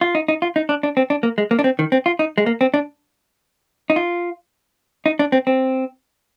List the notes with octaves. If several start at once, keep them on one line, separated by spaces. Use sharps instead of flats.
F4
D#4
D#4
F4
D#4
D4
D4
C4
D4
A#3
G#3
A#3
D4
C4
D#3
C4
F4
D#4
G#3
A#3
C4
D4
D#4
F4
D#4
D4
C4
C4